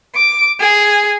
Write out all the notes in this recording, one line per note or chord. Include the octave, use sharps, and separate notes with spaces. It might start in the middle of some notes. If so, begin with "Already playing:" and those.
D6
G#4